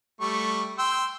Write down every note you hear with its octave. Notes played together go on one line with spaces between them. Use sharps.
G3 A3 C#6
G5 C6 E6